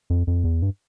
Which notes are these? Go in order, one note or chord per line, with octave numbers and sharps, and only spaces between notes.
F2
F2
E2
G2